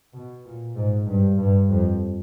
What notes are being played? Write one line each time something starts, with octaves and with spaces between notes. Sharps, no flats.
B2
A#2
G#2
G2
G2
F2